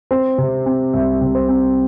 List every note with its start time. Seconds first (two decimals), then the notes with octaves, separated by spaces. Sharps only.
0.11 C4 C5
0.38 C3
0.66 C4
0.93 C2 E5
1.21 C3
1.35 C5
1.49 C4